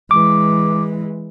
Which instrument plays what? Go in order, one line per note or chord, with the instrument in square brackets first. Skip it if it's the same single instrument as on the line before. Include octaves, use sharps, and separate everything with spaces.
[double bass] E3 G#3 [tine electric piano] D6